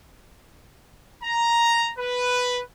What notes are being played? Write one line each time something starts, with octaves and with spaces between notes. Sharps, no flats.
A#5
B4